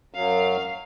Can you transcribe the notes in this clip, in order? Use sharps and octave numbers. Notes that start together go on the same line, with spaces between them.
F#2 F#3 F5